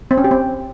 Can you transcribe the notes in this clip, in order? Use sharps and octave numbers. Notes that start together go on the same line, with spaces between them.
C4
C#4
G4
C4